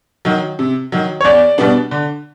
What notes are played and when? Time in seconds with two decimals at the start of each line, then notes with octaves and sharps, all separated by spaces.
0.25 D#3 F#3
0.59 C3
0.92 D#3 F#3
1.21 C#5
1.25 E2 D5
1.58 B2 G3 B3 D4
1.91 D3